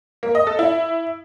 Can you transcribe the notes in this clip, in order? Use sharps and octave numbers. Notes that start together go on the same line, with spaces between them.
A#3
D#5
A4
E4